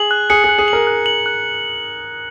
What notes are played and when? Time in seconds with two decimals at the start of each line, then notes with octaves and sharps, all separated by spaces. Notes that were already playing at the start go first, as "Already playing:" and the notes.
Already playing: G#4 F#7
0.11 F#6
0.30 G#4 C#7
0.44 G#4
0.49 F#6
0.58 G#4
0.68 A#4 F#7
0.87 F#6
1.06 F#7
1.26 F#6